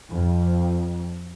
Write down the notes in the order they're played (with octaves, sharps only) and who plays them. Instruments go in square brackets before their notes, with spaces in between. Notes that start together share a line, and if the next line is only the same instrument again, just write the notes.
[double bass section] F2